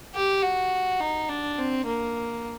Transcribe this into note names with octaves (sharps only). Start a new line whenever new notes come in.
G4
F#4
D#4
D4
C4
A#3